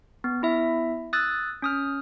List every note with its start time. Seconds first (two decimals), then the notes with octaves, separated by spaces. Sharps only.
0.24 B3
0.42 B3 E4 E5
1.13 D#6 E6 F#6 A6
1.62 C#4 D#6 F6